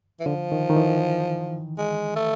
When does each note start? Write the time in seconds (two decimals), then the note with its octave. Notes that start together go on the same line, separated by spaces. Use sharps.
0.20 E3
0.26 D3 F3
0.52 D#3
0.70 D#3
0.76 E3
1.78 G#3
2.16 A3